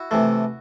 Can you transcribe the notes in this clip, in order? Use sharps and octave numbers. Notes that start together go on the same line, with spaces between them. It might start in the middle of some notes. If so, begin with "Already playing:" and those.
Already playing: E4 F#4
C3 E3 A3